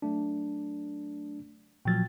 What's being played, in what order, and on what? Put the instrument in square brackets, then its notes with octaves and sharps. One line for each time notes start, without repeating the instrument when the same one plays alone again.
[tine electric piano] F#3 A3 D4
[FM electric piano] A#2 F3 F#3 [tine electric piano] G5 A6